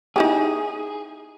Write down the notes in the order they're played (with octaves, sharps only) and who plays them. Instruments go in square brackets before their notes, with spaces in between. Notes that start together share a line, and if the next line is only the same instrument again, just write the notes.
[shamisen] D#4 E4 G4 [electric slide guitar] G#4